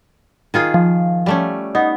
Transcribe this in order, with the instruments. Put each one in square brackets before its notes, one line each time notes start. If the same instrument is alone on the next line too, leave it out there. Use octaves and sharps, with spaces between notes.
[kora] D#3 F4 G#4
[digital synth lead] F3
[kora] G3 A3 C#4
[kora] B3 [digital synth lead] D#4